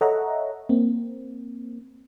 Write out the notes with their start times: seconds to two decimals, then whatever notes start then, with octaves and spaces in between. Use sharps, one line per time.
0.01 A4 C#5 D#5 E5 F#5 A#5
0.69 A#3 C4